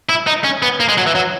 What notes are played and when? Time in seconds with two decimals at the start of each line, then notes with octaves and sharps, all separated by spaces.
0.09 E4
0.27 D#4
0.44 C#4
0.62 B3
0.80 A#3
0.88 G#3
0.98 F#3
1.06 E3
1.15 F#3